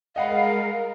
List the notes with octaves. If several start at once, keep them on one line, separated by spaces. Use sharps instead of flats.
G#3 A#4 D#5 F5 F#5 B5